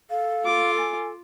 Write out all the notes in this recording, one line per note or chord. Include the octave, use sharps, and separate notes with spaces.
A4 F5
F4 D6
G#5